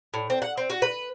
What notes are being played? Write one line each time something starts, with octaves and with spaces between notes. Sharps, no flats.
A2
C4
F#5
C4
F#4
B4